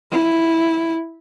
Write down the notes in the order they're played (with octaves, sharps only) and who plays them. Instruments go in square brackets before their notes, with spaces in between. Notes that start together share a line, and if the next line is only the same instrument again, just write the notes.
[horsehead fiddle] E4